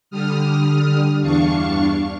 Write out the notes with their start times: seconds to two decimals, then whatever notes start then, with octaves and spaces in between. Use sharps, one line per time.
0.11 D3 G3 D#6 F6
1.22 E2 G2 D4 F5 C#6 C#7